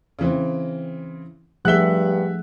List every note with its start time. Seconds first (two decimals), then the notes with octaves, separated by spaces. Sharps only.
0.19 C#3 E3 C4
1.65 G2 F3 A3 G#4 E5 F#5 F#6 G7